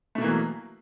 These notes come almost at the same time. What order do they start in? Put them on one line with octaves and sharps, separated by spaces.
A3 B2 A#3 E3 F#3